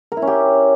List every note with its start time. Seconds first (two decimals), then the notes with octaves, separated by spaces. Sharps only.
0.12 A#4
0.17 E4
0.22 C#4
0.27 G4